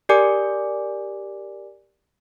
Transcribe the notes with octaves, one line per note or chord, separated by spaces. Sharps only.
G4 A#4 D5 G#5 D6